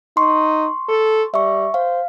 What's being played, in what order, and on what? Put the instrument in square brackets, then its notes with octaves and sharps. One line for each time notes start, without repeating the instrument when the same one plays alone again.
[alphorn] D#4 [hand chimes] C6 C#6
[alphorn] A4
[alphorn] G3 [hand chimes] E5 C#6
[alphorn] C5 [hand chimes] F5